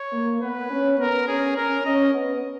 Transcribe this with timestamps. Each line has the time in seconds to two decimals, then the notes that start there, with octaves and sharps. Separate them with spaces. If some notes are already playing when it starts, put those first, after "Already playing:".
Already playing: C#5
0.13 A#3
0.42 B3 B4
0.70 C#4
0.99 B3 A#4
1.28 C#4 G#4
1.56 C#4 A#4
1.85 C#4 D#5
2.14 B3